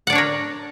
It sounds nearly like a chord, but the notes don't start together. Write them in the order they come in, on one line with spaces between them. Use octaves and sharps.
F#5 D5 D4 C#5 A#4